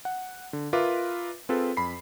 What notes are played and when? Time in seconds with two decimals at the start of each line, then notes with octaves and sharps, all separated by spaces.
0.05 F#5
0.53 D3
0.73 F4 A#4 B4 E5 D6
1.49 C4 F4 G#4 A4 B4
1.77 F2 B5 C7